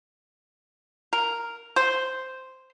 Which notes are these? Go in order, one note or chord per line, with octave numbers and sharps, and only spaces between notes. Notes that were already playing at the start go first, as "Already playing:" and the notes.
A#4
C5